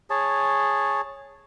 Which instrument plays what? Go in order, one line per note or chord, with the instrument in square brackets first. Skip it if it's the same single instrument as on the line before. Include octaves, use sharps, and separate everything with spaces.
[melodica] G#4 C#5 A5